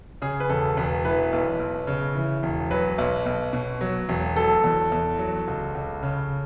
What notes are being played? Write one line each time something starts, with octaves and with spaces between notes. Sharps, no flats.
C#3 G#4
B4
E1 A4
E1 B4
E3 B4
B1
B1
C#3
E3
E1
F#3 B4
B1
B1
B2
F#3
E1
F#3 A4
E2
E2
F#3
C#2
C#2
C#3